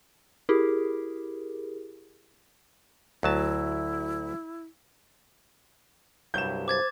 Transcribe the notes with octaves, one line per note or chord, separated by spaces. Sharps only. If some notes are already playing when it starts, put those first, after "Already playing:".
E4 G4 G#4 A#4
D2 F#3 E4 A5
C2 G2 F#3 G6 E7
C5 D6 G#6 A6